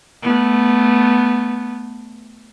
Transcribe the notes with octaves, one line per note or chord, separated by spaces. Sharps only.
A3 B3